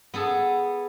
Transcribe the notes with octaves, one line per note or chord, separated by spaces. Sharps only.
B3 G#4 A4